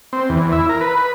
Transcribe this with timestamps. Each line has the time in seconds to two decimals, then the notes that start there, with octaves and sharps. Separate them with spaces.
0.13 C4
0.29 E2
0.52 E4
0.69 A#4
0.81 B4